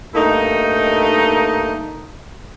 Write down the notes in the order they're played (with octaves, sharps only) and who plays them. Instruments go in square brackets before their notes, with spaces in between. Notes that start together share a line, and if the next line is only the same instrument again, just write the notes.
[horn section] G2 A3 A#3 D#4